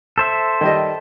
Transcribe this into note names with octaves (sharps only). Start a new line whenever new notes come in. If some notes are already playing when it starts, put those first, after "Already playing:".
A4 C5 E5
D#3 G3 D#5